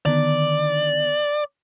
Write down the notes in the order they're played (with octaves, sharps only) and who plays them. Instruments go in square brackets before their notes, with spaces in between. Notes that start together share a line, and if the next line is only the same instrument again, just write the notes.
[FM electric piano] D3 D#3 B3 [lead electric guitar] D5